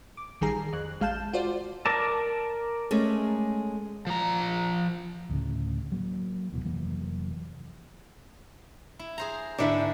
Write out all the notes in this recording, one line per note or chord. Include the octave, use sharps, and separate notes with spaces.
D6
A#1 D#3 G3 G#4 A#5 C7
F2 F#6
A1 G#3 F5 A5 G6 E7
F4 F#4 C5 D5
A#4 D5 A5
G#3 A3 C#4
F3 A#5
D2 A2 C#3
F#3 A#3
D1 B2 E3
F1 E3 F#3 A#3
E4
G#4 C5 A#5
G#2 D3 A#3 D4 E4 E5